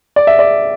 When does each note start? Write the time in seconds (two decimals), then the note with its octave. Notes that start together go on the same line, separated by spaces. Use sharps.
0.16 D5
0.27 E5
0.39 D5